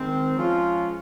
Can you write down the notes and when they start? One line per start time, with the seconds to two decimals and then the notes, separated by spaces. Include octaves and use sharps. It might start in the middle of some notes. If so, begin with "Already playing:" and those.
Already playing: D#3 G#3 C4
0.36 F3 G#3 C#4 F4